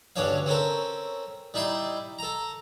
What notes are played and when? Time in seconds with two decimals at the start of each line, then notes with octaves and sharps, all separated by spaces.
0.16 D2 G2 C#4 D4 C#5 F5
0.46 C4 C#4 A4 A#4
1.54 G3 D#4 E4 C6
2.19 A4 A#5